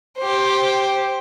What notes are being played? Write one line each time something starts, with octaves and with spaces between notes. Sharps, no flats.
G4 C5